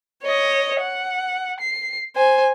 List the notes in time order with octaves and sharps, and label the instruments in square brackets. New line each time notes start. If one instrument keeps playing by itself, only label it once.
[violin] C#5 D#5
F#5
C7
C5 G#5